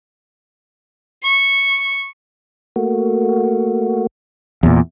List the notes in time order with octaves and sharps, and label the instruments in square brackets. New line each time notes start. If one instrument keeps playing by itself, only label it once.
[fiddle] C#6
[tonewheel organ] A3 A#3 F#4
[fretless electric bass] E2 A#2